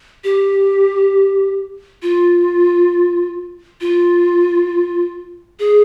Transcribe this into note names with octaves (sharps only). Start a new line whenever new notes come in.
G4
F4
F4
G#4